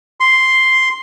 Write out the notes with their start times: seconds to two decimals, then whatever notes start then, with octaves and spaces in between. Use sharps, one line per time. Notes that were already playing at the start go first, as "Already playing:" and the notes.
0.20 C6